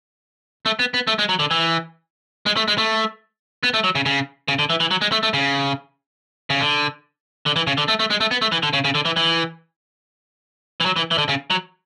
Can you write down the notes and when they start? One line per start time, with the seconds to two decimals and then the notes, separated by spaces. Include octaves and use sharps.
0.66 A3
0.79 B3
0.94 B3
1.07 A3
1.19 G#3
1.29 F#3
1.40 D3
1.51 E3
2.46 G#3
2.57 A3
2.68 G#3
2.78 A3
3.63 B3
3.74 A3
3.84 F#3
3.95 C#3
4.06 C#3
4.48 C#3
4.59 D3
4.70 E3
4.80 E3
4.91 F#3
5.01 G#3
5.12 A3
5.23 A3
5.34 C#3
6.50 C#3
6.61 D3
7.46 D3
7.56 E3
7.67 C#3
7.78 D3
7.88 A3
7.99 A3
8.10 G#3
8.20 A3
8.31 B3
8.42 A3
8.52 E3
8.63 D3
8.73 C#3
8.85 C#3
8.95 D3
9.05 E3
9.17 E3
10.80 E3
10.86 F#3
10.96 E3
11.11 E3
11.18 D3
11.29 C#3
11.50 F#3